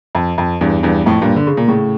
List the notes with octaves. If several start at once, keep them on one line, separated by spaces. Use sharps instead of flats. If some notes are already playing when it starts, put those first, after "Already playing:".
F2
F2
E2 G2
E2 G2
F2 A2
G2 A#2
D3
C#3
A#2
A2 C#3